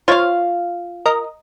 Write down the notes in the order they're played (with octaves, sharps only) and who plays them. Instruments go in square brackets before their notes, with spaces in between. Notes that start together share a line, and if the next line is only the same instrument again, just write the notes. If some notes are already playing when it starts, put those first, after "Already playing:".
[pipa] F4 F5 [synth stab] C5 C#5
[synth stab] A#4 D#5